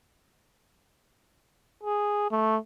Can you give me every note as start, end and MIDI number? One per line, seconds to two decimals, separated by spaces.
1.83 2.27 68
2.31 2.57 57